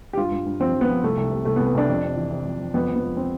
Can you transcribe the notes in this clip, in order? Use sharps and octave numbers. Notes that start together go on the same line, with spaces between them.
G4
G2 F4
G2
G2
F3 C4
F3
B3
F3
C2 A3
C2
C3
C2 A3
B3
C2
B3
C2 D4
F2
C3
E3
C3
F2
F2
F2 B3
F2
B3
F3
C4